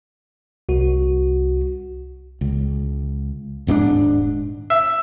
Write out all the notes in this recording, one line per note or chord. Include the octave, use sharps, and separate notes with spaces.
C2 F#4
C#2
D#1 G#2 A3 D4
E5